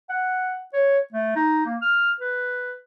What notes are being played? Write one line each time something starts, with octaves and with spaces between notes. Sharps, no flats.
F#5
C#5
A3
D#4
A#3
F6
B4